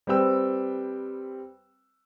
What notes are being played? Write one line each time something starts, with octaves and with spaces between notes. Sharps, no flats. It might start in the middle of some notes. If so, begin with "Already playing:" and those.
G3 C4 B4 G5 E6